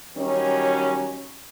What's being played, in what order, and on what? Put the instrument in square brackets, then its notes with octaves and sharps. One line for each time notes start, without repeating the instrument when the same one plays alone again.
[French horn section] D#3 F#3 G3 C#4